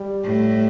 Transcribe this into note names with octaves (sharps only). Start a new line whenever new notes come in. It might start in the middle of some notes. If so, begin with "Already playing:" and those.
Already playing: G3
A2